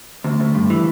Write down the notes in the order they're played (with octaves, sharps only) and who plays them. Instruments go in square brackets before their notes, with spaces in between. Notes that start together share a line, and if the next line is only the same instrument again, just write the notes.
[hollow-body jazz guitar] D2 [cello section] A3
[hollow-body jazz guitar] D2
G2
E3